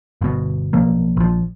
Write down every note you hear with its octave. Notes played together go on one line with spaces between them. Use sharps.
G1 B2
B1 B2 F3 A#3
A#1 F3